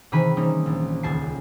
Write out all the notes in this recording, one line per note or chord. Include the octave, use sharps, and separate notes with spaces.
C3 D#3 E3 G#4 B5 D#7
E3 G3 A#3 C4 C#4 D#4
A#1
D#1 C#2 G#5 A5 C7